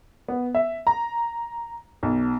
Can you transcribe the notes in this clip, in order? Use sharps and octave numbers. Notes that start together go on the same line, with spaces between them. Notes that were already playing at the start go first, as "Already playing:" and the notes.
B3
E5
A#5
B1